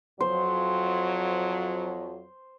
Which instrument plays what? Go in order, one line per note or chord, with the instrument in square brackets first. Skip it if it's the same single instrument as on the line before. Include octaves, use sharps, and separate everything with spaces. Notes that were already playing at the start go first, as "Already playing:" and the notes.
[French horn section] F2 F#3 [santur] C5